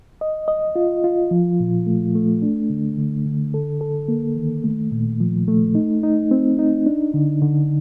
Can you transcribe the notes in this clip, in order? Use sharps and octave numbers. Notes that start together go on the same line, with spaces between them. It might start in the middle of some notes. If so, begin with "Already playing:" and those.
D#5
D#5
F4
F4
F3
A#2
A3
A3
D4
D3
D3
D3
A4
A4
A#3
D#3
A3
A#2
F3
A3
D#4
D#4
C4
D#4
D4
D3
D3